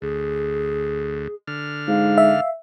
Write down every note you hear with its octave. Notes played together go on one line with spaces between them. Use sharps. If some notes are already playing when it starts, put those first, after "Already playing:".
D2 G#4
D3 F6
G#2 F5
E5